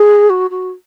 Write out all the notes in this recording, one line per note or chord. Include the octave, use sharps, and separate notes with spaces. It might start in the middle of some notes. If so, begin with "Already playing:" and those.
Already playing: G#4
F#4
F#4